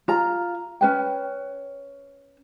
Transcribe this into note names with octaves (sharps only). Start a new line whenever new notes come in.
F4 A#5
C#4 B4 G5